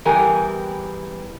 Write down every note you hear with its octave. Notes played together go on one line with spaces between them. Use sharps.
E2 E3 G3 G4 A#4 G#5